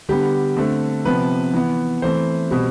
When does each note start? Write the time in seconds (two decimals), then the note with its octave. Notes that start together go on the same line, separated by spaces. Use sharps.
0.09 D3 G3 B3 G4
0.57 D3 A3 C4
1.05 C3 F3 B3 B4
1.54 E3 B3
2.02 E3 A3 C4 C5
2.51 B2 G3 C4